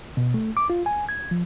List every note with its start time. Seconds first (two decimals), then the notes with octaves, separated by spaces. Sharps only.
0.17 B2
0.34 A3
0.57 D6
0.70 F4
0.86 G#5
1.09 G#6
1.31 F3